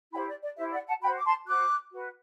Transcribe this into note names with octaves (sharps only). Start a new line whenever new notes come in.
E4 G4 C5 G5 B5
D5
D5
E4 G4 C5 E5
D5 F#5
F#5 A5
F#4 C5 G5 B5
D6
A5 C6
F#4 C5 D6 F#6
F#4 B4